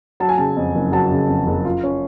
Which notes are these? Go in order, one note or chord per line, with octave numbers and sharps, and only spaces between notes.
F#3 A5
G#5
C#3 A5
F2
F#1
F#3 A5
C#3
F2
F#1
F4
C#4